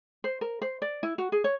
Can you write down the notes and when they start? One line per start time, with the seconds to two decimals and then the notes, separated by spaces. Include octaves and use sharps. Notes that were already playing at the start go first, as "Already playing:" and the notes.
0.24 C5
0.41 A#4
0.62 C5
0.82 D5
1.03 E4
1.18 F#4
1.32 G#4
1.44 C#5